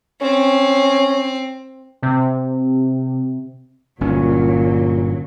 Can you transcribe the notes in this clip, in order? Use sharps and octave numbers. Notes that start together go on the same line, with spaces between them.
C4 C#4
C3
G1 A#2 F#3 C#4